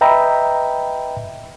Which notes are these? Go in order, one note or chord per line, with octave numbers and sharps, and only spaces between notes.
B4 D#5 E5 G5 A#5 B5